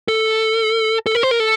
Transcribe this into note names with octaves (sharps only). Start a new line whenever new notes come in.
A4
A4
A#4
C5
A#4
A4